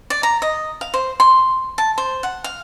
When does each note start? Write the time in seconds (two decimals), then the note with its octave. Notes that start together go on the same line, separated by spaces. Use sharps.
0.10 D5
0.23 A#5
0.42 D#5
0.81 F5
0.94 C5
1.20 C6
1.78 A5
1.98 C5
2.23 F#5
2.44 F5